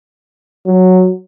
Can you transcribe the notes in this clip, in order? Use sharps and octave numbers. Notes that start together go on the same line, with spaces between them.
F#3